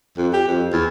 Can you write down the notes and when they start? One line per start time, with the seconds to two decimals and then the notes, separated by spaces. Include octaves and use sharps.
0.17 F2
0.33 G4
0.47 F2
0.72 E2